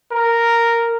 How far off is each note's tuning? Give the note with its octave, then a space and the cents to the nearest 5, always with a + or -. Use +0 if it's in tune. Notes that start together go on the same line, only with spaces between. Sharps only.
A#4 -5